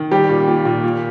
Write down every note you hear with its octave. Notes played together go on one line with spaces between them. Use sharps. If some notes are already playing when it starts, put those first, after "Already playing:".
Already playing: D#3
G3 G4
A#2
A#2
A#2
A#2